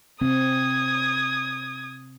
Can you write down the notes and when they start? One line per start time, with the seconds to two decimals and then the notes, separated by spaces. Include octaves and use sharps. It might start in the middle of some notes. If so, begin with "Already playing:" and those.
0.21 C3 C4 D#6 G#6